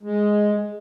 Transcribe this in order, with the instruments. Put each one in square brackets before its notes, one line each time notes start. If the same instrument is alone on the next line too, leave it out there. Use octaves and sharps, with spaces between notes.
[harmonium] G#3